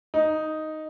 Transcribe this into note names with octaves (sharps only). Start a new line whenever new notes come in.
D#4